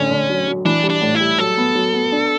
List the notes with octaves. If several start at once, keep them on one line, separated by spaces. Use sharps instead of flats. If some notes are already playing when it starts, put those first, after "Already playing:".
Already playing: A1 D3 C#4
D3
F#3
F#3
E3 D4
G3
D4
A2
E4
G3
F#3 A4
B3
F#3
B3
D4